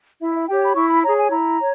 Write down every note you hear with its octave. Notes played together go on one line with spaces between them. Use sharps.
E4 E5
E5
G4 C#5 G5
B5
E4 C#6
B5
G#4 C#5 A#5
G#5
E4 A#5
C#5